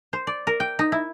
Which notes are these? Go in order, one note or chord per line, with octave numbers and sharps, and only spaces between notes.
C5
D5
A#4
G5
D#4
E4